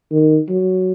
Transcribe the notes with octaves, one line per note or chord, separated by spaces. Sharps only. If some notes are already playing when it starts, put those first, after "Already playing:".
D#3
F#3